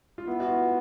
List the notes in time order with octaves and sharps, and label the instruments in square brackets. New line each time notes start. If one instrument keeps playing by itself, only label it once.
[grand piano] F4
[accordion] B3 [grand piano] E4
[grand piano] F#4
F4